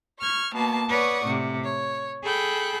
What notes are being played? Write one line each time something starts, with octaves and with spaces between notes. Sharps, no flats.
C#6 F6 G#6
B2 A#3 A5
B4 C#5 D5 F#5 C#6 D#6
A2 C3
C#5
G#4 A4 G5 B5 F#6